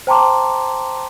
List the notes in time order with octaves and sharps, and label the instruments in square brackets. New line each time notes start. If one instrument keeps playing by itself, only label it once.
[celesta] C5 G5 A5 A#5 C6 D6